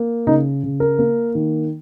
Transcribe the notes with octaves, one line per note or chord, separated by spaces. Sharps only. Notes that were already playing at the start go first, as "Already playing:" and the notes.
Already playing: A#3
C#3 D#4
C#3
A#4
A#3
D#3